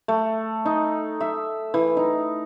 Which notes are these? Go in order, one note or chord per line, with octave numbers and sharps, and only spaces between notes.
A3
D#4
E5
E3
D#4